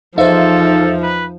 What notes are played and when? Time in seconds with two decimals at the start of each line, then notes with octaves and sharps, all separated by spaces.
0.18 E2 F3 D#4 A4 C5 E5 F5
1.02 B4